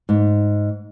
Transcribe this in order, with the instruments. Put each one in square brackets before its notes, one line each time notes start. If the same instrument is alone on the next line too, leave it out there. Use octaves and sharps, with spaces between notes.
[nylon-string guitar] G#2